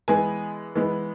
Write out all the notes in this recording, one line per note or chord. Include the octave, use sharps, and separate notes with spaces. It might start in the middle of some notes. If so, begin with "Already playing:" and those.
E3 G#3 B3 G#5
E3 G#3 B3